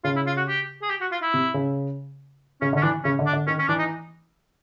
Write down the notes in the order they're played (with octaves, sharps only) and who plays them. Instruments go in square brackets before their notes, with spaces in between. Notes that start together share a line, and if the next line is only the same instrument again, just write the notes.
[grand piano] C#3 [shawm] F4
[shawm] E4
F4
F#4
G4
G#4
G4
F#4
F4
E4
[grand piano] C3
C#3
[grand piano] C#3 [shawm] C#4
[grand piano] D3
[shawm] C#4
[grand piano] E3 [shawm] D4
[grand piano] C#3 [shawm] C#4
[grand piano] D3
[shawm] D4
[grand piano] D3
[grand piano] D#3 [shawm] C#4
[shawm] C#4
[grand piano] E3 [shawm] D4
[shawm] D#4